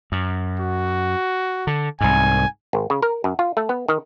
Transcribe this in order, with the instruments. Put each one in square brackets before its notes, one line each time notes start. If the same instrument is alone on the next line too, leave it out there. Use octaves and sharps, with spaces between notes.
[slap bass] F#2
[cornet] F#4
[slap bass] D3
[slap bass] C2 G#2 [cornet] G#5
[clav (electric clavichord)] G#1
C#3
A#4
F#2
F4
A3
B3
D#3